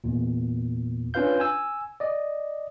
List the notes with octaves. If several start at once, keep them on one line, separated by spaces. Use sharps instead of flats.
E2 A#2
C#4 D4 F4 B4 F5 G6
G#5 E6
D5 D#5